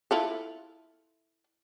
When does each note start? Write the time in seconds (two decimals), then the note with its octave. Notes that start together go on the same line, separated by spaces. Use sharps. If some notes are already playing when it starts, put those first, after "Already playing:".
0.11 E4 F4 A4